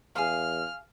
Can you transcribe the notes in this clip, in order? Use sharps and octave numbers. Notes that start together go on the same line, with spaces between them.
E2 G#4 F5 F6